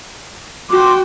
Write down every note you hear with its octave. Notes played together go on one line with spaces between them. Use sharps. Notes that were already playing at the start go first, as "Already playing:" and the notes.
F#4 G5 C6 D6